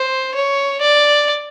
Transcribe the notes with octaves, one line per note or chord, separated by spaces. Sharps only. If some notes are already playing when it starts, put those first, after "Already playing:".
Already playing: C5
C#5
D5